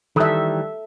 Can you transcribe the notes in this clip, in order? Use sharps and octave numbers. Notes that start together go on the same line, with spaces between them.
D#3 E3 G3 A4 E5